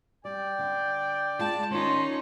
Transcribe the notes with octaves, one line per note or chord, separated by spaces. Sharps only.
G3 D5 G5
D3
G#3 F4 A5
D#3 C#4 D#4 F4 C6